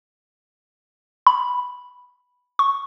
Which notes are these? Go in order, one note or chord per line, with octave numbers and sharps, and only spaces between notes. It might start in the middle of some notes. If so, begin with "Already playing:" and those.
B5
C#6